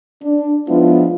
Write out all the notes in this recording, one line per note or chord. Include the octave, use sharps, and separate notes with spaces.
D4
F3 G#3 B3 D4 E4 F4